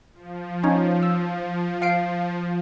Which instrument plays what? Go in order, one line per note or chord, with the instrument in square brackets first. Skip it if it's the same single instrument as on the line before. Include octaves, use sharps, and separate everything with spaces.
[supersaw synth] F3
[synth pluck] C#4 D#4 C#5
E6
F5 C7 D7